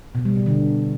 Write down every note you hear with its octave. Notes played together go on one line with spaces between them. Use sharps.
B2
G3
B2
D3